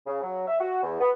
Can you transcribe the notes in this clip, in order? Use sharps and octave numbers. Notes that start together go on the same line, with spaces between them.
C#3
F#3
E5
F#4
E2
B3